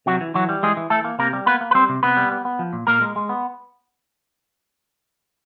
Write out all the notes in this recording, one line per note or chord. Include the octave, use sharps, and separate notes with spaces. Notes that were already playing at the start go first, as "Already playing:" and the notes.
C3 F#3 F#4
E3
E3 F#3 F#4
G3
E3 G#3 G#4
E3
E3 A3 A4
A#3
C3 A#3 A#4
G3
A#3 B3 B4
A#3
B4
G3 C4 C5
C3
C3 B3 B4
G3
B3
B3
F3
A#2
A#2 A#3 A#4
G#3
G#3
B3